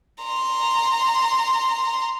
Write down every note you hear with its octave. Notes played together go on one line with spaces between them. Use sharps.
A#5 C6